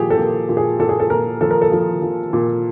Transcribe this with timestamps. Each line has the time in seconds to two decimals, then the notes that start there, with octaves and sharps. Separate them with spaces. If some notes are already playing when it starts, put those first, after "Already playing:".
Already playing: A#2 F3 G4 G#4
0.10 A4
0.17 A#2
0.49 A#2
0.57 G#4
0.79 A#2 A4
0.89 G#4
1.00 A4
1.10 A#2 A#4
1.41 F3 A4
1.51 A#4
1.62 A4
1.72 F3
2.02 F3
2.33 A#2